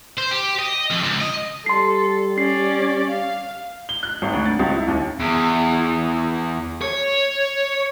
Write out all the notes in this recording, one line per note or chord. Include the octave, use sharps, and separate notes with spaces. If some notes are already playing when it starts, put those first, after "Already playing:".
C5
G4
D#5
F2
C#2
D#5
G3 A4 C6 C7
C#4 D5 C7
F5
G7
F#6
G#1
D2
A6
C#2
E4
D#2
E2
C#5